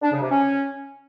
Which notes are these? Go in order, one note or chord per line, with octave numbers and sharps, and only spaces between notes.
D4
C#3
C3
C#4